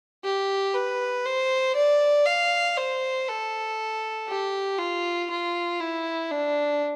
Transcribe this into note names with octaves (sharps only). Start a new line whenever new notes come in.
G4
B4
C5
D5
F5
C5
A4
G4
F4
F4
E4
D4